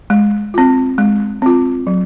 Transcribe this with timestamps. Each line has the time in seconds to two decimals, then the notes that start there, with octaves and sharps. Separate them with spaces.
0.10 G#3
0.54 C4 F4
0.98 G#3
1.42 C4 F4
1.87 F#3